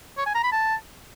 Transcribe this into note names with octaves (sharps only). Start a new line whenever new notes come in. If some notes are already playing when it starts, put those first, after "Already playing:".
C#5
G#5
A#5
B5
A5